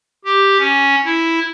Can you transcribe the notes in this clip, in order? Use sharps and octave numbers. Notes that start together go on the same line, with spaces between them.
G4
C#4
E4